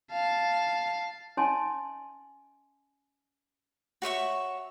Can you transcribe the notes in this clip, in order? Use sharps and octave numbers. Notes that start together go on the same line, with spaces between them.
F5 A5
C#4 D#5 G#5 A5 C6
F#4 C#5 E5 C#6